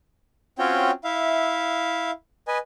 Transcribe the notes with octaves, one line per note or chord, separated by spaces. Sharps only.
C4 C#4 F4 F#4 C#5 G5
E4 E5 F5
B4 D#5 G#5